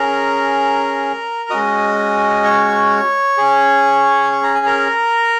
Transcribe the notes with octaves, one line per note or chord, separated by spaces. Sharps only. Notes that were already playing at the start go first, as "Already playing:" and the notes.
Already playing: C#4 G#4 A#4 A#5
G#3 C#4 F#4 D#5 D#6
C#5 C#6
C#4 G#4
C#6
A#5
G#5
A#4 A#5